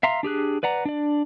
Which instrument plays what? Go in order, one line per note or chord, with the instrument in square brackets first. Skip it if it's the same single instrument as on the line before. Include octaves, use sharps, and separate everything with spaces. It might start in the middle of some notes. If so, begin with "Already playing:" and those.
[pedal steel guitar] E5 F5 A#5 C6
D4 G4 G#4 F#6
B4 D5 F#5 A#5
D4 D5